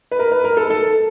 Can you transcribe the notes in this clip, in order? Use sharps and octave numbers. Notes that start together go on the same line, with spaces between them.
B4
A#4
B4
A#4
A4
A4